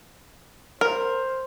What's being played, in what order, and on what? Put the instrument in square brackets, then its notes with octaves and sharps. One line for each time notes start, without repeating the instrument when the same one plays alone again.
[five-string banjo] A#4 [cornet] C5